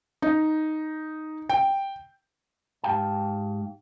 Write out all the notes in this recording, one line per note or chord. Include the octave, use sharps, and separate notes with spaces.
D#4
G5
G#2 G4 F5 G5 A5